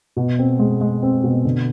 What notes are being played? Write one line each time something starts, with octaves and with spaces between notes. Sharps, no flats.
B2
C4
G#3
G#3
C4
B2
D3